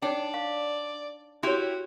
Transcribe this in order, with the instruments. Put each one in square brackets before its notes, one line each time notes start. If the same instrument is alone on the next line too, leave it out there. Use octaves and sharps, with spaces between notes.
[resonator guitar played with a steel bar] D4 [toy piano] D#4 C#5 G5 [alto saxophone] D5
[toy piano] F5
[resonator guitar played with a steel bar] E4 G4 [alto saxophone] F#4 [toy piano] C#5 C6